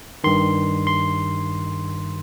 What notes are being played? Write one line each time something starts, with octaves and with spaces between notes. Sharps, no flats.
G2 D#3 C6
C6